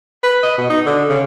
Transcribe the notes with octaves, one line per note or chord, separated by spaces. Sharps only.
B4
D#5
B2
D#4
D3
C#3